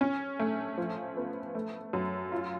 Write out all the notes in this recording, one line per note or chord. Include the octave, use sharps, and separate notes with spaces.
C#4
A3
F3
B3
A3
F#2
F4